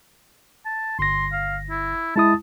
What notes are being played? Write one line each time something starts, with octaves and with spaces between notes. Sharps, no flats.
A5
G1 C6 A#6
F5
E4
G#3 E4 A5 D#6